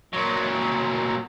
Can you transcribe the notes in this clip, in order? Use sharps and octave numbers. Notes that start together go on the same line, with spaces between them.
A#2 F#3